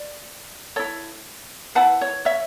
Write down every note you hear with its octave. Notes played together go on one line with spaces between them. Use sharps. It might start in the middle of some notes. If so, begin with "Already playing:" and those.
Already playing: D5
E4 A4 C#5
E4 B4 F#5 A5
C#5
C#5 E5